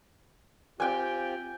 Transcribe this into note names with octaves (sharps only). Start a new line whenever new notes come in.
C4 F4 G4 G5 G#5